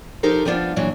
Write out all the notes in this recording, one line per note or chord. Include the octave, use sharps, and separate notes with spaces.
F3 D#4 G4 A4 A#4 C5
F3 G3 B3 D4 F4
A#2 E3 F#3 D4